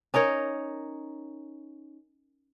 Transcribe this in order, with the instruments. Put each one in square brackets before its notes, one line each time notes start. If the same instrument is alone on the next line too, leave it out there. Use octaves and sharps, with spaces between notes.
[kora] C#4 D#4 A#4 C#5